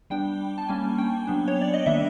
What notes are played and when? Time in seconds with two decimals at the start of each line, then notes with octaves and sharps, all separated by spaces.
0.10 G3 B3 D4 G5
0.58 A5
0.68 G3 A#3 C#4 G#5
0.98 G5
1.27 F#3 B3 D4
1.48 C#5
1.61 D5
1.74 D#5
1.86 D#3 G3 A#3 D4 E5